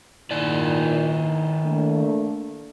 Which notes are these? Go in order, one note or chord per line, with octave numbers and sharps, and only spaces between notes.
A#2 D#3 D#4 E4 D5
A3 A#3 D4